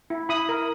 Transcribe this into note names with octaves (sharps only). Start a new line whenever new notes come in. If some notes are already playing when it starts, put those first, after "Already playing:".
E4
E4 B5 D#6
A#4